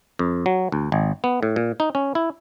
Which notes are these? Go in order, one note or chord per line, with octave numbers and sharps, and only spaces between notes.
F2
F#3
D2
G#1
B3
A2
A#2
D#4
C#4
E4